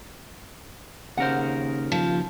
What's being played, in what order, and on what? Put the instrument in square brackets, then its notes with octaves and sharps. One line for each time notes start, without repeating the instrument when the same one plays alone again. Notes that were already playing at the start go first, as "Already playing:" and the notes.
[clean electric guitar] D#2 C#3 A#4 [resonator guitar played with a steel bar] C5 F#5
[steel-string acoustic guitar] F3